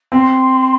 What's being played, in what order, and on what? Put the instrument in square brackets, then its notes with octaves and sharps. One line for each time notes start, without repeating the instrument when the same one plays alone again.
[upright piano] C4 [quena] C6